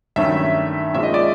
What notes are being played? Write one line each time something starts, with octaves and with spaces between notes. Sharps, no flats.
G2 D#3 F#3 A3 C#4 E5
A#2 F3 G#3 C#4 E5
D#5
D5